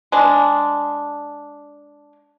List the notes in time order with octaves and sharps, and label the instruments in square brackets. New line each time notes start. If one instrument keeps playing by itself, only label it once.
[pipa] G#3 D4